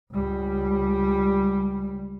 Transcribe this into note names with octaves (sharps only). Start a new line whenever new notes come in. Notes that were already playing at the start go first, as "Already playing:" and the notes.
C#2 G3